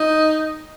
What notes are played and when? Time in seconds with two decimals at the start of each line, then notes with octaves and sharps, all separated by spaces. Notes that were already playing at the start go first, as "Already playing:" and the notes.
Already playing: D#4